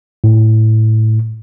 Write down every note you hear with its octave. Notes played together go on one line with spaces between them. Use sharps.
A2